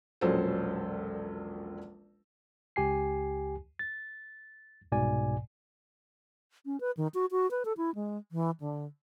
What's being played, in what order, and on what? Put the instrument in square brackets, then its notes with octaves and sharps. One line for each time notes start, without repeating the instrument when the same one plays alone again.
[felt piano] E1 A#1 F#3 C#4 A4 C5
[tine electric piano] C#2 G4 G#5 C7
A6
C2 G#2 B2 D5 G#5
[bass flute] C#4
B4
D#3
F#4
F#4
B4
A4
E4
G#3
E3
D3